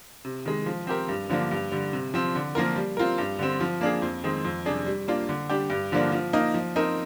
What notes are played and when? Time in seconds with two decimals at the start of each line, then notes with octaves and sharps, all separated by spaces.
0.25 C3
0.46 D#3 G#3
0.66 F3
0.87 C4 G4 A#4
1.08 G2
1.29 D3 F3 A#3 D4
1.51 G2
1.72 D3 G3
1.93 C3
2.14 F3 C4
2.35 D3
2.55 F3 A#3 F4 A#4
2.76 G3
2.97 C4 F4 A#4
3.18 G2
3.39 D3 G3 C4
3.61 F3
3.81 A#3 D4 G#4
4.02 F2
4.24 D#3 G#3 C4
4.45 F2
4.66 C3 G3 D4 G#4
4.86 G3
5.08 A#3 D4 F4
5.29 D3
5.49 G3 D4 G4
5.70 G2
5.92 D3 F3 A#3 D4
6.12 F3
6.33 A#3 D#4
6.54 F3
6.76 C4 D#4 A#4